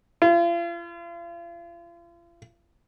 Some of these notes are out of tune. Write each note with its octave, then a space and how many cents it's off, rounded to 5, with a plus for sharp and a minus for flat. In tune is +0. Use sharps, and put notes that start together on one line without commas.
F4 -40